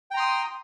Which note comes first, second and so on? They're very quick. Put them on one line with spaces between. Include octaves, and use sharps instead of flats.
G5 A#5 C6 D#6